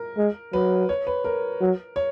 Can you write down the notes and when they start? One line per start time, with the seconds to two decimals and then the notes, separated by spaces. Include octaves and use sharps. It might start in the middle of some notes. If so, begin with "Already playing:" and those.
Already playing: A#4
0.17 G#3
0.53 F#3 B4
0.89 C#5
1.07 B4
1.24 A#4
1.61 F#3
1.96 C#5